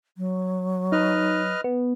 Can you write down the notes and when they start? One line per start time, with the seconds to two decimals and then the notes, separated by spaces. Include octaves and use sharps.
0.18 F#3
0.92 D#4 B4 D#5 F6
1.64 B3